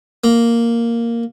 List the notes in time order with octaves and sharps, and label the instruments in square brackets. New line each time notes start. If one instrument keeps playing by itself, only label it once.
[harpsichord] A#3